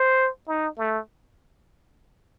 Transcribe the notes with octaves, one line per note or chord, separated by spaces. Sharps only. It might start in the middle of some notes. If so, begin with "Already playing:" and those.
Already playing: C5
D#4
A3